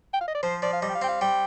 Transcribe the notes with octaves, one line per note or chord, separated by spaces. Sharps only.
G5
F5
D#5
D5
F3 C5
F3 D5
F5
G3 D#5
G5
F5
C4 G5
F5
G3 G5